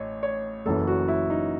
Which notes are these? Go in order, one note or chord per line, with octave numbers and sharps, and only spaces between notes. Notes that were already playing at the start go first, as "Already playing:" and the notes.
Already playing: A1 A2 C#5 D#5
C#5
F#1 F#2 E3 A4
F#4
E4
D#4